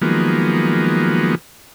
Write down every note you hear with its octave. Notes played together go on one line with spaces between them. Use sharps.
D#3 F3 F#3 G#3 A#3 B3